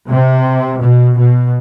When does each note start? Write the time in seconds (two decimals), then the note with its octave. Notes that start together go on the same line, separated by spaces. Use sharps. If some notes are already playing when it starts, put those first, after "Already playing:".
0.11 C3
0.82 B2
1.18 B2